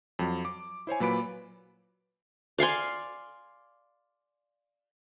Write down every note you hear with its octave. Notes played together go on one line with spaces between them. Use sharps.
F2 F#3
D6
E4 C5 C#5 G#5
A#2 F#3 B4 B5 D7
D5 F5 G#5 C6